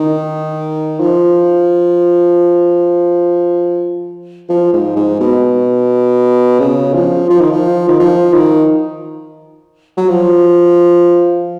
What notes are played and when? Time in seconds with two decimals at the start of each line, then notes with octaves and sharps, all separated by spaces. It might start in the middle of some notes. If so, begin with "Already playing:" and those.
Already playing: D#3
1.00 F3
4.49 F3
4.73 G#2
4.96 G#2
5.20 B2
6.59 C#3
6.95 F3
7.30 F3
7.41 D#3
7.51 F3
7.88 D#3
7.99 F3
8.34 D#3
9.97 F#3
10.09 F3